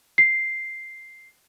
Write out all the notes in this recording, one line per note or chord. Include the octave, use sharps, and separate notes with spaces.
C7